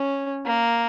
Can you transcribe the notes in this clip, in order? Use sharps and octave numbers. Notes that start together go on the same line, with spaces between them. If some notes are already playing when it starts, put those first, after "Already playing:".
Already playing: C#4
A#3